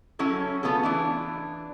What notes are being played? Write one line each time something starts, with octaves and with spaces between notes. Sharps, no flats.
F#3 C#4 E4 A4
A3 B3 F4 G#4 A4
E3 D4 E4